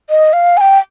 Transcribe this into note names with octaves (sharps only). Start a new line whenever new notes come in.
D#5
F5
G#5
G5